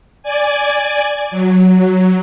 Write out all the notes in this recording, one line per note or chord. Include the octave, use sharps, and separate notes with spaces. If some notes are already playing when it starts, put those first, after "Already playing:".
D5 G#5
F#3